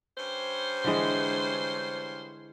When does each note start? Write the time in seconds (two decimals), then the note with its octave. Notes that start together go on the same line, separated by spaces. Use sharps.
0.18 G2 C#4 C5
0.84 D3 E3 G#3